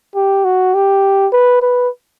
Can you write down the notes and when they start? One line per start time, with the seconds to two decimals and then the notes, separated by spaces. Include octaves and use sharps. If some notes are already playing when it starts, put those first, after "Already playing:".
0.15 G4
0.44 F#4
0.74 G4
1.33 B4
1.62 B4